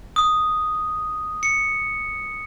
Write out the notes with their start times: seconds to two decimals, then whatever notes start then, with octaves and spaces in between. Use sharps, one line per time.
0.16 D#6
1.43 C#7